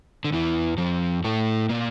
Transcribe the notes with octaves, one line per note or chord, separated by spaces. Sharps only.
D3
E2 E3
F2 F3
A2 A3
A#2 A#3